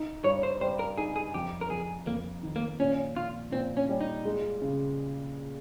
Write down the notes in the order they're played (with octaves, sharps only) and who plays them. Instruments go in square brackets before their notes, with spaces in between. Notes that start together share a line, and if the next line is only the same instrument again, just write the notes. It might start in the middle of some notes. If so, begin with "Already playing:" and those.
Already playing: [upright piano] D#4
[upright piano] G2 [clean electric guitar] C#5
[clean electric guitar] C5
[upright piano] G3 [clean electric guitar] C5
[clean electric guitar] A#4
[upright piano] D#4 [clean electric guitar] G#4
[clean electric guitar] G#4
[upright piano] F2 [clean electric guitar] G4
[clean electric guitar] A#4
[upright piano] F2 [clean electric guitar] G#4
[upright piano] F2 [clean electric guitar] A#3
[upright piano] D#3
[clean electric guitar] A#3
[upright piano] A#2 [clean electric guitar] C#4
[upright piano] A#2 [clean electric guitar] F4
[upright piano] A#2 [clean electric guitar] C4
[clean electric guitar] C#4
[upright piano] G3
[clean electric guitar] D#4
[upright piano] G#3
C#3